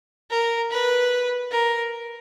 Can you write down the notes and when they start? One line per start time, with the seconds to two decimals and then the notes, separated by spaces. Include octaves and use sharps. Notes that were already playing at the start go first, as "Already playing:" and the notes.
0.30 A#4
0.71 B4
1.51 A#4